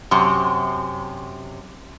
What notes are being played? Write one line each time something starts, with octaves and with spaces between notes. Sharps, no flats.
F#2 C3